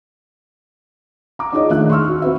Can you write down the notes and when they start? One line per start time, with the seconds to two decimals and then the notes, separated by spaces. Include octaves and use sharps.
1.39 A#5 D6
1.53 D4 D#4 F4 G#4 C#5 D#5
1.70 D#3 A3 G#4 E5 F#6
1.90 C6 C#6 E6 F6
2.08 F#4
2.22 C4 F#4 B4 E5